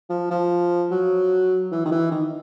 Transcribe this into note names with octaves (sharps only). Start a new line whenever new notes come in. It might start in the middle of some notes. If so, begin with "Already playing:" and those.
F3
F3
F#3
E3
D#3
E3
D#3